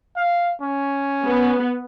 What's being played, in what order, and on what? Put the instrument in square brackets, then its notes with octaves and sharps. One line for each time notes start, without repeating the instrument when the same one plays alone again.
[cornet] F5
C#4
[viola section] B3